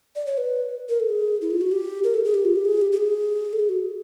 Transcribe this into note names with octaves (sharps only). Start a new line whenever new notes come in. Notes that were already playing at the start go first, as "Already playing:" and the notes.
D5
C#5
B4
A#4
A4
G#4
E4
F4
F#4
G4
A#4
A4
G#4
G4
F4
G4
G#4
G4
G4
G#4
A4
G#4
F#4